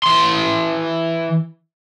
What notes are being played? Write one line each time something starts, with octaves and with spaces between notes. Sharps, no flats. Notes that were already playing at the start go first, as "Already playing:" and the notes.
E3 C6